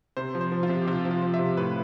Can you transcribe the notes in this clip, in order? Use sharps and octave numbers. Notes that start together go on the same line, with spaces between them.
C3 C5
F3
C5
F3
F4
C3
G4
C3 F4
F3
F4
F3
E5
C3
A2 B4